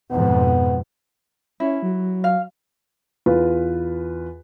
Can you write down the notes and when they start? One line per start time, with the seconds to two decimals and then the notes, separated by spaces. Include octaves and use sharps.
0.11 F2 G#2 B2 B3
1.60 C#4 E4
1.83 F#3
2.24 F5
3.26 E2 F4 B4